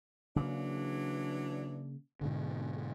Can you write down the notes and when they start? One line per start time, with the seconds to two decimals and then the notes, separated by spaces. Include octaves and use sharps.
0.36 C#3 E3 F#3 A#3 D4
2.21 G#2 B2 D3